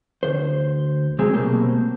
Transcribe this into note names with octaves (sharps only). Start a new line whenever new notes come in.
D2 C5
C#2 C3 F#3 G#3 C4 G#4
B2 G3 A3 A#3 C4